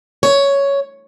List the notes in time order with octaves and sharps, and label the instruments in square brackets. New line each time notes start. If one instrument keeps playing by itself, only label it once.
[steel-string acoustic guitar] C#5